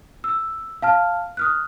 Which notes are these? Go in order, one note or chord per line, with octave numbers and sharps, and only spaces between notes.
E6
F5 A5 F6
D#6 F6 F#6